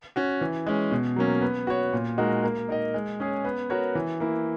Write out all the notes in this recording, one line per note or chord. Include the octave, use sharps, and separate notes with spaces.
C#4 F#4
E3
G#3 C#4
B2
F#3 A#3 C#4
B3
F#4 C#5
A#2
G#3 D#4 F#4 A#4
A#3
D#4 A#4 D#5
G#3
C#4 G#4 C#5
B3
F#4 A#4 C#5
E3
A#3 E4